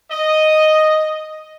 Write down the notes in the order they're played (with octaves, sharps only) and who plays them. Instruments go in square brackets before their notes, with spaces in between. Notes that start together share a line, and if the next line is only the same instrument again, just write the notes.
[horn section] D#5